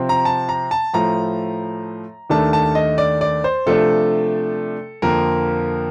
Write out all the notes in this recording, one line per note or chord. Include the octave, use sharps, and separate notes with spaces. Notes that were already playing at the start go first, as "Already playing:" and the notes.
Already playing: C3 F3 C4
A#5
A5
A#5
A5
A2 F3 A3 A#5
D#2 D#3 A3 D4 A5
A5
D#5
D5
D5
C5
C3 F3 A3 D4 A4
F2 D3 F3 A#3 A#4